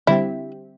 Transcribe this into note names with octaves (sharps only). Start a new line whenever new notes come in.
D3 G3 C4 E4 G4